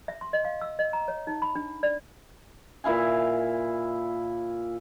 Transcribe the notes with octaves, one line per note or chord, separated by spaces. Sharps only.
E5
C6
D#5
F5
E6
D#5
A#5
C#5
D#4
B5
D4
D5
A#2 E4 F5 G#5